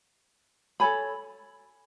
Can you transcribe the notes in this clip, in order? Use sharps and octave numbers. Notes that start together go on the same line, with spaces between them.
A4 C#5 G#5 B5